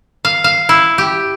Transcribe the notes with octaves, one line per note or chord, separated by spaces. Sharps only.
F5
F5
E4
G4